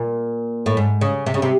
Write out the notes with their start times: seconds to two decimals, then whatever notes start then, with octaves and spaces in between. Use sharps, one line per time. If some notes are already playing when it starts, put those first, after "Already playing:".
Already playing: A#2
0.66 A2
0.77 G#2
1.01 C#3
1.26 C3
1.34 C#3
1.42 C3